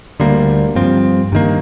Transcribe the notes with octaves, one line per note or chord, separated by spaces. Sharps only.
D2 D3 G3 A#3
G2 F3 C4
G2 D#3 A#3